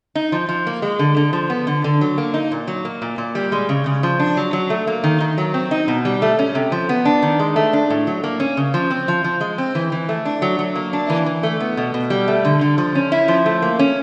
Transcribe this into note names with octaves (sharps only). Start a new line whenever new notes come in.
D#4
F3
F3
A#3
G#3
D3
D3
F3
B3
D3
D3
F#3
A#3
D#4
A#2
F#3
A#3
A#2
A#2
G3
G#3
C#3
C#3
F3
D4
F#3
F#3
A3
A#3
D#3
D#3
F#3
C4
D#4
B2
G3
A3
C#4
C3
F3
B3
D4
D#3
G#3
A3
D4
A2
F#3
A#3
C#4
C#3
F3
C4
F3
F3
G#3
C4
E3
E3
A3
D4
F#3
F#3
A#3
D4
E3
E3
A3
B3
B2
B2
G3
A3
D3
D3
F3
C#4
E4
F3
A3
A#3
C#4